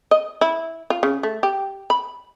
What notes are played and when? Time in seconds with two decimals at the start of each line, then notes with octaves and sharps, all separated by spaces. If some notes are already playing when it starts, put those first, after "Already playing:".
0.11 D#5
0.41 E4
0.90 F4
1.03 C#3
1.23 A3
1.43 G4
1.90 B5